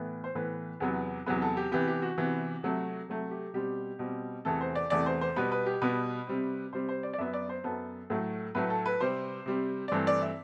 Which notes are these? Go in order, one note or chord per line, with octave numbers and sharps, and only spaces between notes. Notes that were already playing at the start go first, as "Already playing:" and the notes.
Already playing: A2 E3 B3
C5
A2 E3 B3 B4
E2 C3 F#3 B3
E2 C3 F#3 B3 B4
A4
G4
C3 E3 B3 G4
G4
F#4
C3 E3 B3
C3 F#3 A3
C3 F#3 A3
G4
B2 G3 C4 G4
B2 G3 C4
E2 C3 E3 A3 A4
C5
D5
E2 C3 E3 A3 D5
C5
C5
B2 G3 B3 B4
B4
G4
B2 G3 B3 B4
C3 G3 C4
C3 G3 C4 C5
C5
D5
D5
F#2 F#3 B3 E5
D5
C5
F#2 F#3 B3 A4
A2 F#3 A3
A2 F#3 A3 B4
A4
B4
C3 G3 C4 C5
C3 G3 C4
D5
G2 E3 A3 C4 C5
D5
E5